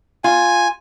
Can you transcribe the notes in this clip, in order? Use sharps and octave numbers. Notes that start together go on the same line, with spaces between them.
F4 G#5